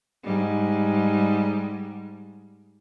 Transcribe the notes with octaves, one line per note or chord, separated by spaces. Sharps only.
G#2 G3